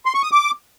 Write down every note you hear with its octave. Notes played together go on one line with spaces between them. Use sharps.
C6
C#6
D#6
D6